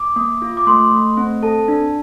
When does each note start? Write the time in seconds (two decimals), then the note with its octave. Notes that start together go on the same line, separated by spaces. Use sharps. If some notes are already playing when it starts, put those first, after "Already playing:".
Already playing: D6
0.16 A#3
0.42 F4
0.57 D6
0.67 A3 C6
0.92 A3
1.17 C4
1.43 A4 A5
1.68 D4